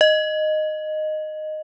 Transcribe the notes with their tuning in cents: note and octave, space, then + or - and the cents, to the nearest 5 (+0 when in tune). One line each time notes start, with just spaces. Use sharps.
D#5 -10